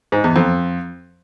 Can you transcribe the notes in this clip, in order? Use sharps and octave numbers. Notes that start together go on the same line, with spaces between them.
G#2
E2
F2